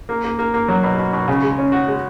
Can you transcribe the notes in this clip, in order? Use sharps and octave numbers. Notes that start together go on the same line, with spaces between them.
A#3
A#3
A#3
A#3
F#3
B2
B2
B2
C#3
G#3
C#4
F#4
G#3